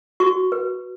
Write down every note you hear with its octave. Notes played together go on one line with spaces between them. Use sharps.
F#4 C#6
B4